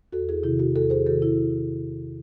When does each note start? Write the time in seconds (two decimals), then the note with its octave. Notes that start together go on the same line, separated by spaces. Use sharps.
0.12 E2 F#4 A4
0.29 E4 G#4
0.43 C3 D#3 E4
0.59 F#4
0.75 E2 F#4 A4
0.90 G#4 C5
1.06 C3 D#3 F#4 A4
1.22 E4 G#4